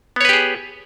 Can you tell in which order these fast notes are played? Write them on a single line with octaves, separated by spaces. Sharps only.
B3 C#5 B4 G4 G#4